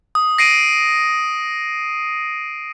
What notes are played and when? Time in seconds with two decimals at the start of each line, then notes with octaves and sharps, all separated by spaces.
0.15 D#6
0.38 A#6 C7 D7 D#7